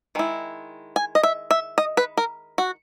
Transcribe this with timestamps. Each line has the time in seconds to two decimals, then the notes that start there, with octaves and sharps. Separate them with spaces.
0.15 D#3 G#3 E4
0.96 G#5
1.15 D#5
1.23 E5
1.51 E5
1.78 D#5
1.97 B4
2.17 A#4
2.58 F#4